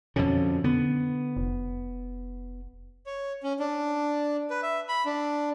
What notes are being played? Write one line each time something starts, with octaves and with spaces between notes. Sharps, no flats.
F2 B2 D3 C#4
D3 B3
F1
C#5
C#4
D4
B4
E5
B5
D4